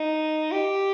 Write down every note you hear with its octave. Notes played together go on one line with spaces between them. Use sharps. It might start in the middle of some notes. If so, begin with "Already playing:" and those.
Already playing: D#4
G4